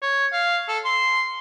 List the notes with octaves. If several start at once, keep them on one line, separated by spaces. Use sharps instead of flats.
C#5
F5
A4
C6